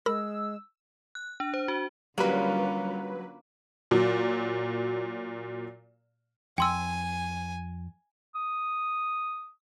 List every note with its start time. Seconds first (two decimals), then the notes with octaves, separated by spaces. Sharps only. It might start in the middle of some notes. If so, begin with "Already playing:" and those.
0.06 G#3 A#4 B5 E6 A#6
1.15 F#6
1.40 D4
1.54 C5
1.68 F#4
2.18 D3 F#3 G3 A#3 C#4 F4 B4
3.91 A#2 F#3
6.58 F2 G5 G#5 C6 E6
8.35 D#6